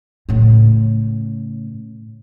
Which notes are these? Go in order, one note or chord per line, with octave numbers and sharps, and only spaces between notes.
A2 C#3